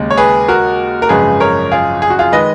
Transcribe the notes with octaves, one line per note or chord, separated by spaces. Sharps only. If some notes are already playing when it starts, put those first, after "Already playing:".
Already playing: D#2 C#3 G#3
C#5
G#4 B4
F#4 A#4
A#4
G#1 F#2 C#3 F3 G#3 G#4 B4
A#4 C#5
F4 G#4
G#4
F#4
F4 G#4
D#3 G#3 B4 D#5